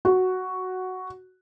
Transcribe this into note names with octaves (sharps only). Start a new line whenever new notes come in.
F#4